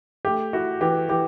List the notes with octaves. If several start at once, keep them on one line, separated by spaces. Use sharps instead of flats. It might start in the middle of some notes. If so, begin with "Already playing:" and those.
A3 G4
E4 F#4
E3 G4
E3 G4